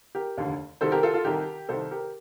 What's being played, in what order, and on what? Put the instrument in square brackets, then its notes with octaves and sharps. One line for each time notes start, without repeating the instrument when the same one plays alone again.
[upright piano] G4 A#4
F1 D#2 D3
C2 C3 D#3 A4 C5
G4 A#4
F4 A4
F4 A4
C2 C3 D#3 G4 A#4
C2 C3 D#3 A4 C5
G4 A#4